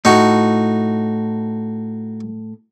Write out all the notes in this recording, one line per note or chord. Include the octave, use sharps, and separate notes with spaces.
A2 D#4 F#4